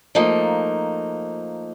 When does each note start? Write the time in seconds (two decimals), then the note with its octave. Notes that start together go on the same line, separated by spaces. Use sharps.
0.15 F3 A3 A#3 D#4